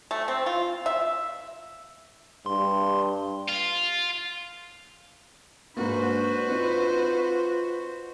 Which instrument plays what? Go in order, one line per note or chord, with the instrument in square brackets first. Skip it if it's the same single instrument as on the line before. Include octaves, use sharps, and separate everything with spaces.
[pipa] A3
C4
F4
E5
[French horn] G2 [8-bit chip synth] C6
[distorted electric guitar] F4
[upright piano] G#2 A#3 [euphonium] D4 [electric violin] F#4 C5 [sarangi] B4
[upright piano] C4 D#4 [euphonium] F4